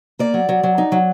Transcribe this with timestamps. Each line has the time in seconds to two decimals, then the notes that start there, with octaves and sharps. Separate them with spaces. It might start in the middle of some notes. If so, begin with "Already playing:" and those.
0.19 A#3 D5
0.34 F#3
0.49 F#3
0.63 F#3
0.78 D#4
0.92 F#3